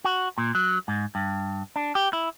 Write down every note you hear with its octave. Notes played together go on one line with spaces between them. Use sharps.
F#4
A#2
F#3
G#2
G2
D4
G4
E4